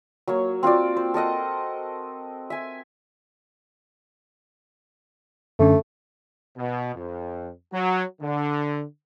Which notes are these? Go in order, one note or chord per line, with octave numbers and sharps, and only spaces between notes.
F#3 A#3 C#5
C4 F4 F#4 D5
C5
A4 A#4 D#5 F#5
E5 G#5
F#2 D3 A3 C#4
B2
F2
F#3
D3